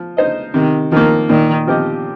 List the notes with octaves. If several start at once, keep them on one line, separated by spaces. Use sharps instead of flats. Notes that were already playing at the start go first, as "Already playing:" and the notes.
Already playing: F3
D#4 C5 D#5
C3 D#3
D#3 F3 A#3
A#2 D#3
F3 C4 G4 D#5